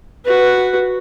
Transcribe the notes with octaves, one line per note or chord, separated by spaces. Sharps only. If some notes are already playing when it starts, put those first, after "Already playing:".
F#4 B4